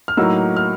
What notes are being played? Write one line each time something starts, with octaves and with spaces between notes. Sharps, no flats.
F6
A2 F#3 A#3 D#4 E6
F6